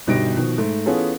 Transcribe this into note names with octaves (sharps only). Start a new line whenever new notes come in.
G1 B2 G3 D#4 A#6 D7
B2 D#3 F3
G#2 A3
E3 B3 C#4 F4 G#4 A4